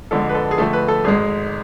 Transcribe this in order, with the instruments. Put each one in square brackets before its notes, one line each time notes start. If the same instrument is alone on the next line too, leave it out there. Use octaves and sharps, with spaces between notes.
[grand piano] F2 D3 G#3 A4
B4
A4
G#4
F2 D3 A3 A4
B4
A4
G#1 G#2 G#3 G#4